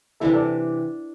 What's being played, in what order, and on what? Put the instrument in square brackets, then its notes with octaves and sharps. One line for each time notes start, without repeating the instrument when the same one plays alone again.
[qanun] C3 E3 G3 D4 [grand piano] E4 A4
[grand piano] A4 D5